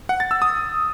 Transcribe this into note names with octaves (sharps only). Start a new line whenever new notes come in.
F#5
A6
E6
D#6